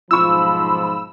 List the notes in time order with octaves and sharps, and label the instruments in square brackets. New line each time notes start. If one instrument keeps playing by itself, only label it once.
[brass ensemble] B1 G#2 F3 [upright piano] F4 C#6 [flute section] B5 [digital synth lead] E6